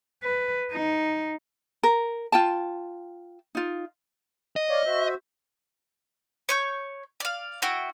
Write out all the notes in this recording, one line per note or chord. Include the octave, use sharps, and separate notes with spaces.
B4
D#4
A#4
F4 G5 A5
D#4 F4
D#5
C#5 D5 F5
F#4 C5 E5
C#5 C#6 G6
D5 F5
E4 F#4 G5